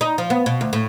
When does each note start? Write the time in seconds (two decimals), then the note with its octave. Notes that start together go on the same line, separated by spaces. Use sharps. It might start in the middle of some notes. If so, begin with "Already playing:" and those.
0.01 D#4
0.18 F3
0.30 B3
0.46 B2
0.61 D2
0.73 A2